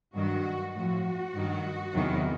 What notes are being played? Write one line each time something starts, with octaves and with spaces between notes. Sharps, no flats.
G2 D#3 F#3 F#4
A2 F3 F#4
G2 D#3 F#3
E2 C3 D#3 F#3